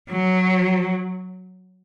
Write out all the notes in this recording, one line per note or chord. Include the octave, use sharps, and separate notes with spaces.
F#3